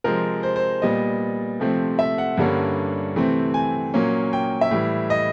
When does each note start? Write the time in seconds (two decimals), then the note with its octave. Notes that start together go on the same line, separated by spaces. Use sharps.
0.04 C3 F3 G#3 C4 A#4
0.43 C5
0.56 C5
0.82 A#2 G3 B3 D#5
1.60 C3 F3 A3 C4
1.99 E5
2.18 F#5
2.37 G2 D3 G3 A#3 C#4
3.16 C3 E3 A3 C4
3.54 G#5
3.94 A#2 F#3 A#3 C#4
4.33 G5
4.61 E5
4.71 A2 E3 G3
5.10 D#5